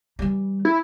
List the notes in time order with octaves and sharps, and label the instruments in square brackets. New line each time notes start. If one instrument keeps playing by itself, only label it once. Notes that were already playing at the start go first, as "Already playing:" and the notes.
[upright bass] E3 G3
[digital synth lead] E4